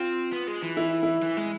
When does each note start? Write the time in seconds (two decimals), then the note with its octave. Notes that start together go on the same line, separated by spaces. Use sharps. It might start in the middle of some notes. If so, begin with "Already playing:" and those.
Already playing: C4 F4
0.33 B3
0.48 G#3
0.63 E3
0.77 E4
1.03 E4
1.22 E3
1.37 G#3